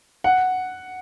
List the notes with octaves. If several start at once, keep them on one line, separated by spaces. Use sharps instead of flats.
F#5